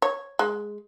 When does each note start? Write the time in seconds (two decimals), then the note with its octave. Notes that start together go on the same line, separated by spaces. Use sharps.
0.02 C#5
0.39 G#3